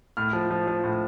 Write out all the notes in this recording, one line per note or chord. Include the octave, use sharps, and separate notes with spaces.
A2 F6
F3
F3
F3
A2